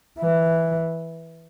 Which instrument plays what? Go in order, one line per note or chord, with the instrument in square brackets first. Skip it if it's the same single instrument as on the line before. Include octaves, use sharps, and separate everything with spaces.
[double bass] E3